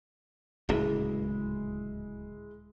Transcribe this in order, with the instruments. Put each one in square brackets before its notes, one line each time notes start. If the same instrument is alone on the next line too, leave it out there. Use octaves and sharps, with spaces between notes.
[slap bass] D1 C#2 A#2 [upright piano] G#3 E4